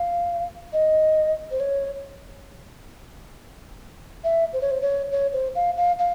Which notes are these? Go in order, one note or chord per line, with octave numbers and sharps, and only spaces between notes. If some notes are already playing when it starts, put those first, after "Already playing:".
Already playing: F5
D#5
C5
C#5
E5
C5
C#5
C5
C#5
C#5
C5
F5
F5
F5